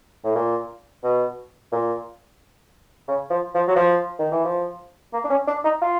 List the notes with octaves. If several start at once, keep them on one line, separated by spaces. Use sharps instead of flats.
A2
A#2
B2
A#2
C#3
F3
F3
F#3
F3
D#3
E3
F3
A#3
D4
C#4
D4
D#4
F4